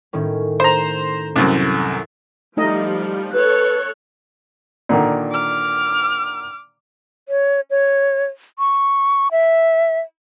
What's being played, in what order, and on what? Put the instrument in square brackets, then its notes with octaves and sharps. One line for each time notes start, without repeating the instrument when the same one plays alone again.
[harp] A2 D#3 C#4
[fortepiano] C5 A#5
C2 F#2
[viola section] F3 G3 [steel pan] A3 D#4 D#5
[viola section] A4 C#5 [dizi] B4 [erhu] F#6
[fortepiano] A#2 D3 D#3
[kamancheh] D6 F6
[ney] C#5
C#5
C#6
E5